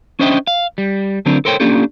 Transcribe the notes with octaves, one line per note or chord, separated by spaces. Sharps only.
C#4 D4 C5 D#5 E5 G5
F5
G3
D3 F#3 C4 D4 A#4
A4 A#4 C5 C#5 G5
A#3 C#4 D4 F4 G4 A4